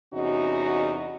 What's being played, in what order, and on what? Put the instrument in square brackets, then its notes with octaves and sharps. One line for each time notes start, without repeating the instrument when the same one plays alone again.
[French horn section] E2 C3 C#4 D#4 F#4 D#5